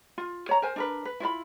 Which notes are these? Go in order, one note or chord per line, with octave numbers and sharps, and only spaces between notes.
F4
C#5 A#5
A#4 C5 G#5
D4 A#4 B4
B4
E4 F4 D#5 B5